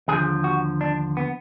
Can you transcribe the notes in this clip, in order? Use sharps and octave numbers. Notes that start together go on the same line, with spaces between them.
D#2 D3 F3 G#4
F#4
D4
B3